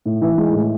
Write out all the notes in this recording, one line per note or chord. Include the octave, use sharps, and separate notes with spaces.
A2
E3
G#3
A2